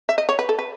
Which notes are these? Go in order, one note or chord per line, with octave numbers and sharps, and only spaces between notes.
E5
D#5
C#5
B4
A4
B4